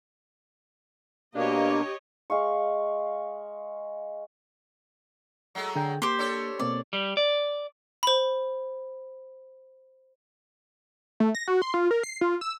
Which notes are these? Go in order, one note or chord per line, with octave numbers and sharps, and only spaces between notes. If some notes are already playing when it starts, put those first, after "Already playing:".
B2 A#3 D4 G4 C#5 D#5
G#3 F5 C#6
F#3 G#3 A3
D3 G#4 G5
A#3 G4 C5
D4 A4 C#5
B2 A#3 C4 D5
G3
D5
C5 B5
A3
A#6
F#4
C6
F4
A#4
C7
F4
E6